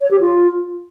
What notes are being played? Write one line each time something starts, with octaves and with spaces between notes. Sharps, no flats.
C#5
G4
F4